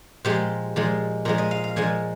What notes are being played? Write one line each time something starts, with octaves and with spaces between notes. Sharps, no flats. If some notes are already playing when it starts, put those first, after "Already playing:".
A#2 F3 G#3 G4
A#2 F3 G#3
A#2 F3 G#3 A#4
D#5
F5
F5
A#2 F3 G#3 G#5